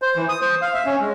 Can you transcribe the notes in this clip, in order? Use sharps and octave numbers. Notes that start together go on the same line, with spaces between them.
C5
E3
D#6
C5
F5
E5
C#4
G#3